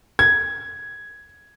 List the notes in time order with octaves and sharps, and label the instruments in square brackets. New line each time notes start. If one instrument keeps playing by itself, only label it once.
[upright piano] G#6